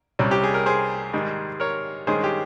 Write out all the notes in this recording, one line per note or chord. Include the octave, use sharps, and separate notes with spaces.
C2 C3 G3 C#4
G4
G#4
A#4
G#4 C5
G#2 D#3 G3
A#4 C#5
G2 D#3 G#3 C#4 G#4 C5
G4